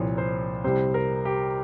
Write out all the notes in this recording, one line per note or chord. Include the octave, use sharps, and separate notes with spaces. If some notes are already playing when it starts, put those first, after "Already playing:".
Already playing: C2 A#2 F3 C#5
C5
C2 C3 G3 C4 C5
A#4
G4